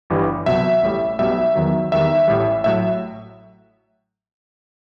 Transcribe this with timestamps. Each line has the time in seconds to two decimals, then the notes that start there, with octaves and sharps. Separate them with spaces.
0.10 G1 G2 E3 G3
0.46 C2 B2 F#3 E5
0.83 A1 A2 G3
1.19 B1 B2 G3 E5
1.55 E2 D#3 F#3
1.92 E2 D#3 G3 E5
2.28 A1 A2 G3
2.64 A2 F#3 E5